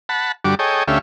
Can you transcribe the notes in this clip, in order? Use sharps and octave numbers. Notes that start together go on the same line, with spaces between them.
F#5 A5 B5
G2 D3 G3 F#4 D6
G#4 A4 C#5 D#5 G5
D2 A3 C#4 G4 E5 F5